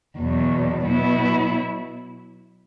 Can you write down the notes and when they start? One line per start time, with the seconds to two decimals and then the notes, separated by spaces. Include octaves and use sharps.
0.17 E2 B2 F#3
0.86 B2 F#3 B3 E4